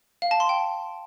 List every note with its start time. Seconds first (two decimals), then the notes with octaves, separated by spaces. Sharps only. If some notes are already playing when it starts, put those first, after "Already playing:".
0.22 F5
0.31 A5
0.40 C6
0.49 G5